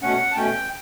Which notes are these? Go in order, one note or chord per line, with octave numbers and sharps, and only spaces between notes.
B2 A3 C#4 F#5
A5
B2 A3 C#4 G5